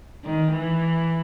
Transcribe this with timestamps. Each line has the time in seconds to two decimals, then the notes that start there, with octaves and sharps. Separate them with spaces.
0.24 D#3
0.51 E3